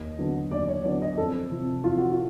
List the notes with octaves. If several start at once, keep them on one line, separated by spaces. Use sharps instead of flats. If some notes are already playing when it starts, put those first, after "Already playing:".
Already playing: D#2 D#5
D3 F#3 B3 D4
D#2 D5
C#5
D3 F#3 B3 D4 D5
D#5
F2 A4
C3 F3
F2 F4
F#4
F4